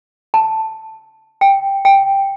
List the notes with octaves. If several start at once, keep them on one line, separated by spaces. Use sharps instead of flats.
A5
G5
G5